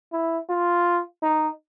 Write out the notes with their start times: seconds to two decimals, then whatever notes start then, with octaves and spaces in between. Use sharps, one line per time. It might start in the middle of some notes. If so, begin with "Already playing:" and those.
0.13 E4
0.49 F4
1.23 D#4